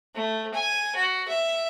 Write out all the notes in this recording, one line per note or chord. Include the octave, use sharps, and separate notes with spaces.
A3
G#5
F#4
E5